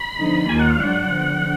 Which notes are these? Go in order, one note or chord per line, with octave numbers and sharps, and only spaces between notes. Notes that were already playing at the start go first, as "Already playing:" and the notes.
Already playing: B5
D3 F3 B3 D#4
D#2 D#3 A#3 F4 G#5
F#5
F5
G#2 F#3 D4 F4 F#5
D3 F3 B3